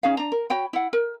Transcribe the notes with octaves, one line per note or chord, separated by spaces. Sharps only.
C#4 D#4 G#4 F5
D4 A#5
A#4
F#4 C#5 G5 B5
E4 F#5
A#4